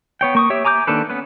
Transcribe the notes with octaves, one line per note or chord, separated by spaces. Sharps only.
B3 C#5 G5
A#3 C#6 D#6
G4 C#5 E5
G#5 A#5 D6 E6 G6
D#3 A#3 D4 A4 B4
B3 C#4 B4